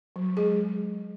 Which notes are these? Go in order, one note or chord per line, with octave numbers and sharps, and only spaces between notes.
F#3
G#3 G#4